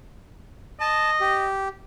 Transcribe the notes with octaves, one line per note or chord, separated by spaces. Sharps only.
D#5 A5
G4